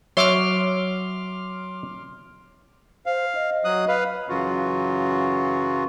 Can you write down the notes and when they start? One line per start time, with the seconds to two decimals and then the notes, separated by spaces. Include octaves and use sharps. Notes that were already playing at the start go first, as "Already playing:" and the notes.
0.17 F#3 C#5 E5 C6 D6 F6
3.06 C5 F5
3.35 D#5
3.65 F#3 D#6 F#6
3.88 B4 F5
4.29 F#2 C#3 E3 F#3 F4 F#4